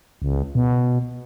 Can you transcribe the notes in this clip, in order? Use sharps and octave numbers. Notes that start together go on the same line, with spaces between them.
C#2
B2